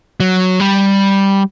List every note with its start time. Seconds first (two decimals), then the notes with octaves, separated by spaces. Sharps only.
0.20 F#3
0.60 G3